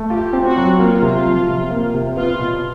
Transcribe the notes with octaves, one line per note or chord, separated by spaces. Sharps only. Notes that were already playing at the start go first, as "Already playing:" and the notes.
Already playing: A3
F4 G4
C4
F#4
F#3
A#3 F4
C3
F3
C3
A#3
C3
B3 F4
B2